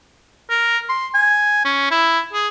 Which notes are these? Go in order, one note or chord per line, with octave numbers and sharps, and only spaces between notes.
A#4
C6
G#5
C#4
E4
G#4